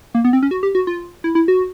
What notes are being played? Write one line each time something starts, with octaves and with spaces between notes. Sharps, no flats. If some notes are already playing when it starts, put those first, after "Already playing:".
A#3
B3
C4
C#4
F#4
G4
F#4
F4
E4
E4
F#4